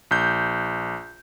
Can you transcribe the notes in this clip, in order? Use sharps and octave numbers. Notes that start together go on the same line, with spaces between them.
A#1 G6